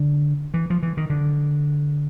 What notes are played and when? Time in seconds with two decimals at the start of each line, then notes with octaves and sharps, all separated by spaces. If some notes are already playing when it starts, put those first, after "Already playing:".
Already playing: D3
0.54 E3
0.70 F3
0.83 E3
0.97 D#3
1.10 D3